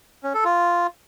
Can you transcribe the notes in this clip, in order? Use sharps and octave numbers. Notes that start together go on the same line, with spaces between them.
C#4
A4
F4